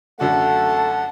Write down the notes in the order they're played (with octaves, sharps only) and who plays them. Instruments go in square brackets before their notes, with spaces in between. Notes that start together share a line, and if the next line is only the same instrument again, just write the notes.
[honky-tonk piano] F#2 D3 F#4 [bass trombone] A3 [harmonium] F#5 [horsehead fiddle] A5